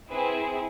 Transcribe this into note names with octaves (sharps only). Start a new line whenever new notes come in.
C4 E4 G#4 B4